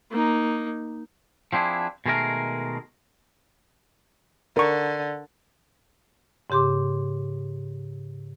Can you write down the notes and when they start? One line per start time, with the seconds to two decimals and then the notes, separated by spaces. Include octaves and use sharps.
0.11 A#3 D#4
1.53 F3 C4 D4 E4 G#4
2.06 B2 D#3 G#3 A3 G#4 A#4
4.57 D3 A#4 C#6
6.50 G#2 C#3 G4 C6 D6